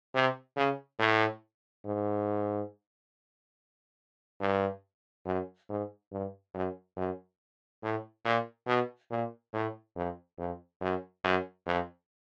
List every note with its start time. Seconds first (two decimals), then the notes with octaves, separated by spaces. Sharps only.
0.14 C3
0.57 C#3
0.99 A2
1.85 G#2
4.41 G2
5.26 F#2
5.69 G#2
6.12 G2
6.54 F#2
6.97 F#2
7.83 A2
8.25 A#2
8.67 B2
9.11 A#2
9.53 A2
9.96 F2
10.38 F2
10.81 F#2
11.24 F#2
11.66 F2